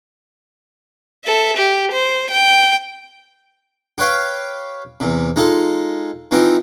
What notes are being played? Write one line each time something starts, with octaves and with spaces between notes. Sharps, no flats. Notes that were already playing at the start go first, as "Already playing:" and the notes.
A4 E5
G4
C5
G5
G4 B4 C#5 F5 G5
E2 C3
G#3 D#4 F4 A4
E3 F3 C4 D#4 G4